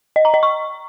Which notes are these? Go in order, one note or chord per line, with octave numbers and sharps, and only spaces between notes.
D#5
A#5
D#5
C#6